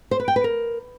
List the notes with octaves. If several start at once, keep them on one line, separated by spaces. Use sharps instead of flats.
C5
B4
G5
B4
A#4